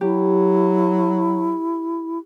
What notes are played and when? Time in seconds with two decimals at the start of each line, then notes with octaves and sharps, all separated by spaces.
0.01 F#3 E4 G4